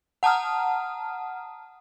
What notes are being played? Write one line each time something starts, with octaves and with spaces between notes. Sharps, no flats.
F#5 A5 A#5 D#6 F6